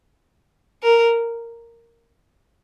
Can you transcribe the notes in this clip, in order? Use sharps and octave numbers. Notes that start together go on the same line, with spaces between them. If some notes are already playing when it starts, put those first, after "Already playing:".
A#4